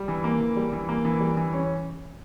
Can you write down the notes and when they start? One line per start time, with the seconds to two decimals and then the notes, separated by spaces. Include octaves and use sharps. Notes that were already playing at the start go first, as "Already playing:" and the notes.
Already playing: G3
0.08 E3
0.24 A#3
0.40 E3
0.57 G3
0.73 E3
0.89 A#3
1.05 E3
1.20 G3
1.37 E3
1.53 C#4